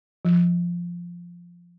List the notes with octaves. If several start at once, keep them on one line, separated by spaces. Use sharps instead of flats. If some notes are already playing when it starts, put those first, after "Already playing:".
F3